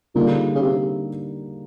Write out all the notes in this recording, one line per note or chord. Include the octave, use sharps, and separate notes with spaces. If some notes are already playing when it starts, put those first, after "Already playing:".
A#2 D3 G3 A#3 D#4 G#4
C#3
C3